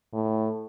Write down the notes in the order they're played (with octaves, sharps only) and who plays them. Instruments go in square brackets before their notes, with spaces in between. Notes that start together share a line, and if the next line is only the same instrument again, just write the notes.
[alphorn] A2